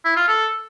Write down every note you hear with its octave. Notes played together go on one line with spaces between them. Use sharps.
E4
F4
A4